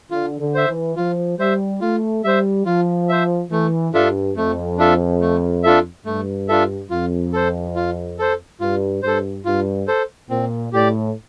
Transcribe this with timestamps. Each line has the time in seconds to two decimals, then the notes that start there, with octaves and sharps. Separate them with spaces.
0.11 D3 F4
0.40 D3
0.54 C5 E5
0.68 E3
0.96 F3 F4
1.39 G3 C5 E5
1.81 A3 F4
2.24 G3 C5 E5
2.66 F3 F4
3.09 C5 E5
3.51 E3 A3
3.93 G2 D4 F4 A4 E5
4.36 F2 A3
4.78 D4 F4 A4 E5
5.21 A3
5.64 D4 F4 A4 E5
6.06 G2 A3
6.49 D4 F4 A4 E5
6.91 F2 F4
7.33 A4 C5
7.75 F4
8.19 A4 C5
8.60 G2 F4
9.03 G2 A4 C5
9.45 G2 F4
9.88 A4 C5
10.30 A#2 C4
10.73 A2 G4 D5